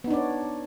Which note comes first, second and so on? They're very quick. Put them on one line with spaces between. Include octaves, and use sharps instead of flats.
B3 D#4 D4 D5 C#5